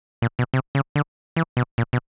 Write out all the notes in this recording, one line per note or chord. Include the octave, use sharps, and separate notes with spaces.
A#2
B2
C3
C#3
D3
E3
B2
A#2
B2